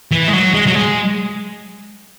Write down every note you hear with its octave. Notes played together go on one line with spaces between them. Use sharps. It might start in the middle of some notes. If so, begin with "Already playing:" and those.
E3
G#3
F#3
G#3
F#3
G#3